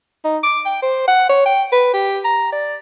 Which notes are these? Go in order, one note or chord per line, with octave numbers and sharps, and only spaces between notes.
D#4
D6
G5
C5
F#5
C#5
G5
B4
G4
A#5
D5